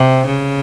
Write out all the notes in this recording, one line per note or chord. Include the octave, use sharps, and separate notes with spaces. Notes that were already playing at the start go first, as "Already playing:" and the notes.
Already playing: C3
C#3